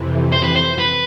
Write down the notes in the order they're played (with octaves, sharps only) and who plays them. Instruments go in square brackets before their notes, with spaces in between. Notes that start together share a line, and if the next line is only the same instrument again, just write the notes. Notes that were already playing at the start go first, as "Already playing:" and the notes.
Already playing: [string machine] F2 C3 E3
[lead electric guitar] C5
B4
C5
B4